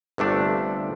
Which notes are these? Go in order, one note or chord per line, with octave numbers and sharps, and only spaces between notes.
G1 C3 A3 D4